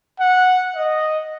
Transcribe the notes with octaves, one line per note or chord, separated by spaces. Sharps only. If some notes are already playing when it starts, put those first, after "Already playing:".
F#5
D#5